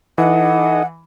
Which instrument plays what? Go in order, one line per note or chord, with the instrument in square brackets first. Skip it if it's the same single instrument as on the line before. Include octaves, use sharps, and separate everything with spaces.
[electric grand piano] E3 [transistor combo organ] D#4 A4 D#5 [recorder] F#5